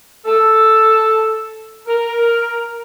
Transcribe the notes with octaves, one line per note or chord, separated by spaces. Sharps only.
A4
A#4